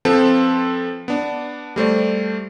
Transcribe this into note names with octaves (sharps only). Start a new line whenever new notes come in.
F3 C4 A4 B4
B3 D4
G3 A3 C5 D5